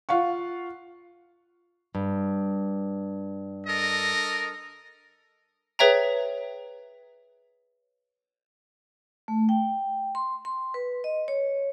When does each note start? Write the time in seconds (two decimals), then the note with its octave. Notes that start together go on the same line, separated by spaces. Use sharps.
0.09 F4 F5 F#5 C#6
1.95 G2
3.67 A4 A#4 D#5
5.79 G#4 B4 C#5 E5 G5 A#5
9.28 A3
9.49 G5
10.15 C6
10.45 C6
10.74 B4
11.04 D#5
11.28 C#5